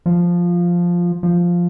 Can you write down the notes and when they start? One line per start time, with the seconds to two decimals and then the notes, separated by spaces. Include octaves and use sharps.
0.06 F3
1.23 F3